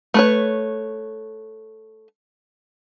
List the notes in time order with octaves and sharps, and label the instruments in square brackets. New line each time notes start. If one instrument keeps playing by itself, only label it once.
[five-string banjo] A3 B4 C#5